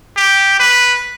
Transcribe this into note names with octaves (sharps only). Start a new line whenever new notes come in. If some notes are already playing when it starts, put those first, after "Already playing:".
G4
B4